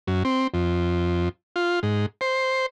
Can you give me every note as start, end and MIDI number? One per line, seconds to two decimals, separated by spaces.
0.07 0.23 42
0.25 0.47 60
0.54 1.29 41
1.56 1.80 65
1.83 2.06 44
2.21 2.66 72